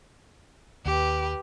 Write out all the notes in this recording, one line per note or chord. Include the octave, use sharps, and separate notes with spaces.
D#2 G4 B4